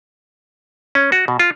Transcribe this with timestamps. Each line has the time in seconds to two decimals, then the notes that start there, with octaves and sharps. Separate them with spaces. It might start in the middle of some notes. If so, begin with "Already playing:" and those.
0.95 C#4
1.12 F#4
1.28 B2
1.40 F4